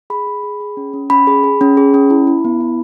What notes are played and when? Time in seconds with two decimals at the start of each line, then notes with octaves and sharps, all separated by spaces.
0.10 G#4 B5
0.27 G#4
0.43 G#4
0.60 G#4
0.77 C#4
0.93 C#4
1.10 C#4 B5
1.27 G#4
1.44 G#4
1.61 C#4
1.77 G#4
1.94 C#4
2.10 E4
2.27 E4
2.44 B3
2.61 E4